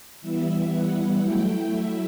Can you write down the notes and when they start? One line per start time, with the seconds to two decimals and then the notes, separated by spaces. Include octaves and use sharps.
0.21 E3 G3 B3 E4 E5
0.70 F#5
1.19 F#3 A3 E4 G5
1.69 E5